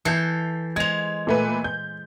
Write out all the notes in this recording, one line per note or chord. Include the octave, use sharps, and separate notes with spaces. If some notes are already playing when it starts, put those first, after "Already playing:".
E3 A4 G6 C7 C#7
G#3 C5 G#6 F7
A#2 A3 B4
G6